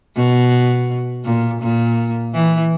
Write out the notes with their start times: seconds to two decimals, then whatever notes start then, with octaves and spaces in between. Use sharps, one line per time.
0.16 B2
1.25 A#2
1.62 A#2
2.34 E3